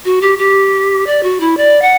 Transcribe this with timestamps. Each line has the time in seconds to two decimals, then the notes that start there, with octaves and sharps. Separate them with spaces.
0.05 F#4
0.21 G4
0.38 G4
1.06 D5
1.23 F#4
1.40 E4
1.57 D5
1.82 F#5